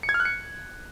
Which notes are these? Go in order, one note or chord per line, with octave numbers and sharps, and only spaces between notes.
C#7
G#6
F6
F#6
C#7